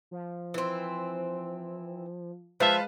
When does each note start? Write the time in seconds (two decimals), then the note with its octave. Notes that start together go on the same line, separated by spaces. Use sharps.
0.11 F3
0.54 E3 C4
2.60 F3 G#3 B4 E5 F5 A5